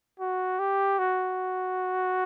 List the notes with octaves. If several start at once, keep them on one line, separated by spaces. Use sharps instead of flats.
F#4
G4
F#4